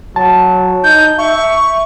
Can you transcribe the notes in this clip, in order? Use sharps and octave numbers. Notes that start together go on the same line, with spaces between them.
F#3 A5
D#4 G6
E5 C#6